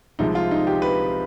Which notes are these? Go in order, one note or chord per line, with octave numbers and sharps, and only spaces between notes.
C2 C3 F3 G#3 D#4
F4
D#4
G4
B4